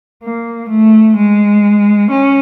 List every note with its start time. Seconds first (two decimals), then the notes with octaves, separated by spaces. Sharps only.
0.23 A#3
0.70 A3
1.17 G#3
2.11 C#4